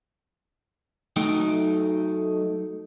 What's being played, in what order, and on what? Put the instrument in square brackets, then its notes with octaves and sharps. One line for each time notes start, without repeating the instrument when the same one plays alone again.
[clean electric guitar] F#3 D#4 G5 [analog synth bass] A3